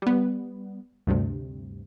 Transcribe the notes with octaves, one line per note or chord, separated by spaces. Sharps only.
G3 B3
D2 G2 C3